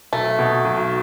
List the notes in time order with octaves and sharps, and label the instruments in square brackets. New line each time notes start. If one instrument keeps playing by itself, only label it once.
[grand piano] B1 [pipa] A3
[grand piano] B2
B1